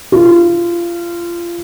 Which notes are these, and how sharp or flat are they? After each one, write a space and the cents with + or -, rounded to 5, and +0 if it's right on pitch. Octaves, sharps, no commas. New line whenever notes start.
F4 -25